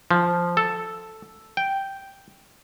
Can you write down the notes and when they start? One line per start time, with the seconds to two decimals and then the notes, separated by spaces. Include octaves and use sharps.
0.11 F3
0.57 A4
1.57 G5